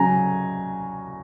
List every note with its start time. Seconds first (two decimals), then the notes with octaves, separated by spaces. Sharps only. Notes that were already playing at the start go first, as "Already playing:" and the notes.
Already playing: C#3 F#3 G#5 A#5